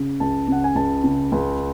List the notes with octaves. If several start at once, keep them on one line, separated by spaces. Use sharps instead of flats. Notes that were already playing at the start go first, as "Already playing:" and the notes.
Already playing: C#3
C#2 A5
C#3 F#5
G#5
C#2 A5
C#3
C#2